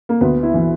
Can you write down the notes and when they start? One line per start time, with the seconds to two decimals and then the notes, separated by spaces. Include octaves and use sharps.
0.09 A#3
0.21 D2 B3
0.43 E4
0.54 E3